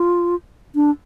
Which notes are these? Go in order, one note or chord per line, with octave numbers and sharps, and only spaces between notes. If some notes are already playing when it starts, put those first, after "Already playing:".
Already playing: F4
D4